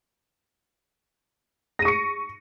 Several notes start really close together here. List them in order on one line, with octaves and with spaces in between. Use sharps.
A#6 D#7 C#6 C#7